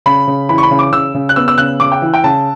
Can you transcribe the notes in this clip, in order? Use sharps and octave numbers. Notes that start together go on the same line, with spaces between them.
C#3 B5
C#3
E3 B5
C#6
B5
C#3
D6
C#3 E6
C#3
F#6
B3 E6
E6
C#3 F#6
C#3 D6
G5
E3
G5
C#3 A5